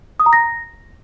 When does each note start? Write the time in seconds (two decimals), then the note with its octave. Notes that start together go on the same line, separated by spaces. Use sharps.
0.20 D#6
0.26 A#5
0.33 A#6